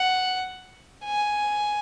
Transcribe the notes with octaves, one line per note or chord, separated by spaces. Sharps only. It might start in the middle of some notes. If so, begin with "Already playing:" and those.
Already playing: F#5
G#5